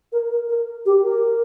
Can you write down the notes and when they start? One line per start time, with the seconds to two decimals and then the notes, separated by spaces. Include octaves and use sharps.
0.12 A#4
0.30 A#4
0.48 A#4
0.85 G4
1.03 A#4